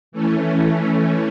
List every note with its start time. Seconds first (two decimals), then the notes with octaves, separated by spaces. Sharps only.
0.12 E3 A3 C#4